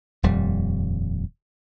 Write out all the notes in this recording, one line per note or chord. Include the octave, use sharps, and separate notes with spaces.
D#1 F2 G3